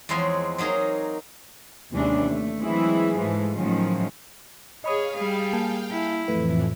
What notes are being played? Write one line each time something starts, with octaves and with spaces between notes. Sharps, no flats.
E2 F3 G#3 C4 C#5 G#5
F#3 A#3 D#4 G#4 A#4
D#2 C3 E3 G#3 C#4 D4
A3
E3 F#3 G#3 C4 E4 G#4
G#2 E3 F3 G#3 A3
A2 D#3 F3 F#3 G#3 C#4
G#4 C#5 D#5 F5 B5 D#6
G3 G#4 F5 G5
A#3 G#5 A5
E4
F2 A2 E3 F3 A3 B4